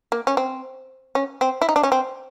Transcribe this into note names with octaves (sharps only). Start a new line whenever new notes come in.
A#3
C#4
C4
C#4
C4
E4
D#4
D4
C#4
C4